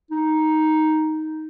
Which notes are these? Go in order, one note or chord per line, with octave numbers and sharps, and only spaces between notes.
D#4